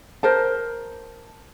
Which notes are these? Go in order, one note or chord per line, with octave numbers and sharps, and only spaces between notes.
A#4 C5 A5